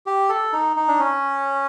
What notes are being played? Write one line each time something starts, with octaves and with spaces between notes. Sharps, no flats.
G4
A4
D#4
D#4
D4
C#4